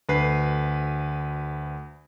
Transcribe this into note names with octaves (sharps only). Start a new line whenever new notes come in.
D2 B4 C7